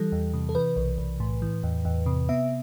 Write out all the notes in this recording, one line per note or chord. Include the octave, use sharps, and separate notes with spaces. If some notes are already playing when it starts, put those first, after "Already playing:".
Already playing: E3 G3 A4
E2
C3
A4
E3 B4
B1
B1
A2
E3
E2
E2
C3
B3 E5